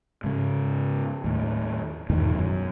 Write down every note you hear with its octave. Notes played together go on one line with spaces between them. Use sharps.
G#2 C#3
D#2 A2
E2 G#2 B2 D#3
F#2